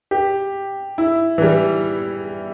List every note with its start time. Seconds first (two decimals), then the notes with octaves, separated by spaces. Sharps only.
0.11 G4
0.98 E4
1.38 E3
1.42 G3